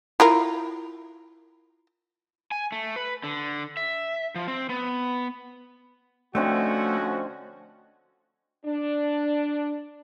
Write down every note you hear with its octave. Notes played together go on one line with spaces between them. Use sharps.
E4 F4 A#4
G#5
A3
B4
D3
E5
F3
C4
B3
D3 F3 A3 C4 C#4 F#4 D#5
D4